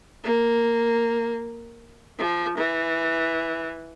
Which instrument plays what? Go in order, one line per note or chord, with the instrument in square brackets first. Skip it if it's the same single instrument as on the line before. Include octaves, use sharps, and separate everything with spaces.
[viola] A#3
F3
E3